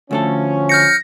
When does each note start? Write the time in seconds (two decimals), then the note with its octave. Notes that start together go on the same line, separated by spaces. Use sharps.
0.11 D2 F3 A3 C#4 A4
0.69 F6 G6 A#6 C#7